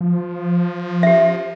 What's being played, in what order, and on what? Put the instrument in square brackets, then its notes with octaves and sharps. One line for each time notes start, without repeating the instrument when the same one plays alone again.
[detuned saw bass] F3
[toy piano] G4 E5